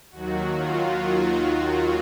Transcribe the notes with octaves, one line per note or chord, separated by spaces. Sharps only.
D#2 D#3 F#3 F#4
F4
F#4
F4